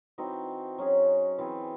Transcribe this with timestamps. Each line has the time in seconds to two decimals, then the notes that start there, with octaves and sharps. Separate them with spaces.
0.18 E3 C4 D#4 F#4
0.78 F#3 C#4 G#4
1.38 E3 C4 E4 G#4